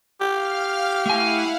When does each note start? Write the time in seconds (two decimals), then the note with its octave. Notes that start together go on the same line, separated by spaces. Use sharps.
0.21 G4 F5 F6
1.06 A3 E4 F5 F#5 G#5